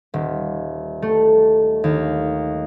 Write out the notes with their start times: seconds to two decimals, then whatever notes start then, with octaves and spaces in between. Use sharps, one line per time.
0.14 D#1
1.02 A3
1.84 D#2